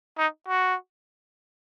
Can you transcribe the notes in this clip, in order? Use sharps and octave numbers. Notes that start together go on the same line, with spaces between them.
D#4
F#4